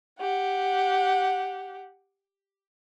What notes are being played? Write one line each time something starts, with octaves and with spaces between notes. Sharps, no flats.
G4 F#5